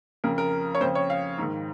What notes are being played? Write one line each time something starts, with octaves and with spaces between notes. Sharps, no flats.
F2 C#3 A#4
A#4
C#5
F2 C#3 C5
C#5
F5
G#2 D#3